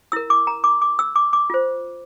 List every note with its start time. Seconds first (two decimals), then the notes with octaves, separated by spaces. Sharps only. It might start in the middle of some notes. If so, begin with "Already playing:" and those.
0.12 E4 A#4 E6
0.30 D6
0.47 A#5
0.64 D6
0.82 D6
0.99 E6
1.16 D6
1.33 D6
1.50 F4 C5